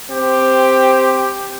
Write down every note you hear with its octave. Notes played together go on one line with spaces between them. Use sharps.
C4 G4